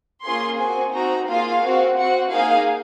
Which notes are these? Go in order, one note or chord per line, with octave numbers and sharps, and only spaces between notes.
A#3 C#4 F4 G#4 C6
C4 F#4 G#5
C4 D#4 F#4 A#5
A#3 F4 G#4 F5
C4 F#4
C4 F#4 F#5
A#3 D#4 G#4 F5